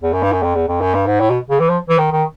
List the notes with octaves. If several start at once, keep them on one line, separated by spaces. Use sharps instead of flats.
E2
F#2
G2
F#2
F2
E2
F2
F#2
G2
G#2
A2
B2
C#3
E3
F3
E3
D#3
D#3